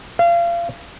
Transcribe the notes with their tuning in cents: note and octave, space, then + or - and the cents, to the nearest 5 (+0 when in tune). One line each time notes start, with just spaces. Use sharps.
F5 -30